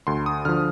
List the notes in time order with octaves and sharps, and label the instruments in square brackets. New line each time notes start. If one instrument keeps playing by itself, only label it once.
[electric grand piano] D2 C6
D#6
D3 F3 F6